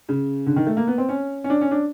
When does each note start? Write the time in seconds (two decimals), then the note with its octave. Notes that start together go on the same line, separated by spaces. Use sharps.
0.09 C#3
0.46 D3
0.56 D#3
0.67 A3
0.77 A#3
0.87 B3
0.98 C4
1.09 C#4
1.44 C#4
1.50 D4
1.61 C#4
1.71 D4